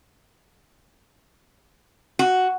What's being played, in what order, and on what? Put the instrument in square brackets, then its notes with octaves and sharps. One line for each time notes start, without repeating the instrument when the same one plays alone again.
[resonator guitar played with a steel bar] F#4